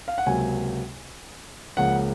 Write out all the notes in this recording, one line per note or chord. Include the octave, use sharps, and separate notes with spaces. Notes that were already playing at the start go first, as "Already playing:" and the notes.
F5
F#5
C#2 C3 F#3 A#3 G#5
C#2 C#3 F3 A#3 F#5